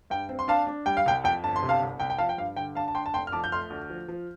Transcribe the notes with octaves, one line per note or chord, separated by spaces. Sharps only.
G2 G5
C4
C6
D4 F5 A5
D4
G3 G5
F5
C2 G5
F2 G5
G1 A5
C6
C3
F5 A5
C2
C2 G5
G5
F3 F5 A5
G5
G2 F5
D3 G5
D4 F5 A5
A5
D4 G5 C6
A5
F1 G5 C6
F6
F2 A5 D6
G6
A3 C6 F6
D2
F3
F3